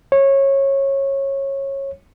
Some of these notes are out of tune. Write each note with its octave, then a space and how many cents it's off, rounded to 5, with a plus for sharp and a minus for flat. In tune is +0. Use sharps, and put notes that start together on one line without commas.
C#5 -20